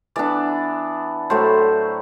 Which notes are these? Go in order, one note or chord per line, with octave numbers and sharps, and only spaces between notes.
E3 B3 D4 D5
A2 F#3 A3 E4 C5